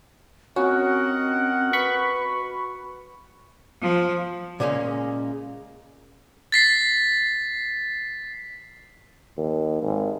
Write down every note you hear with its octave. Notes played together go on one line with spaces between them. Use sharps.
C4 C#4 F#4 A#4 D#5 F#5
B4 B5 C#6
F3
A#2 C#3 G#3 A#3 C#4
A6 B6 C7
D#2
G#1